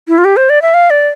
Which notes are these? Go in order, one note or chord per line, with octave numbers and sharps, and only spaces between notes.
E4
F4
G4
C5
D5
E5
F5
D5